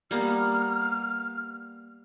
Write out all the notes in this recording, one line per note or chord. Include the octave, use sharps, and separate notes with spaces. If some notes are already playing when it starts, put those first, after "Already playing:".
G3 A#3 B3 F6